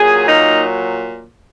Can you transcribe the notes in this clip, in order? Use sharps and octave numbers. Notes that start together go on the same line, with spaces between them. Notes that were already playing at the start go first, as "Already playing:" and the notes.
Already playing: A#2 F#3 G#4
A#3 D#4